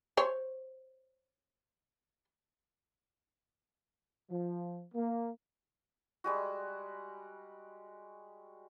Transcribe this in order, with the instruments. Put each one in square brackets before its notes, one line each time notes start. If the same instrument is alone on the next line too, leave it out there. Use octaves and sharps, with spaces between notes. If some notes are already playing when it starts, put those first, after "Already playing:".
[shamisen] C5 C#5
[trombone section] F3
A#3
[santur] G3 G#3 F#4